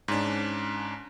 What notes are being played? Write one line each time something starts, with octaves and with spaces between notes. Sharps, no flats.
G#2 C#4 D4